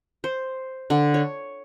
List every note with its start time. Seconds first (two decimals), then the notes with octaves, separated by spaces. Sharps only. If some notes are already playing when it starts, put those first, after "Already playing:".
0.24 C5
0.90 D3
1.14 C#5